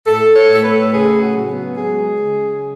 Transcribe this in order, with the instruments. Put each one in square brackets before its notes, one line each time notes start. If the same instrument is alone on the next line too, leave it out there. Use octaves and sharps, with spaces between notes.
[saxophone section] A2 A4
C#5
A2
A4
B4
C#3 G#4
F#4
F#3
B3
G#3 G#4
C#3